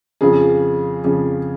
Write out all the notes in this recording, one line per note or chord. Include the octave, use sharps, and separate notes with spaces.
F2 C#3 F3 G#4
F2 C#3 F3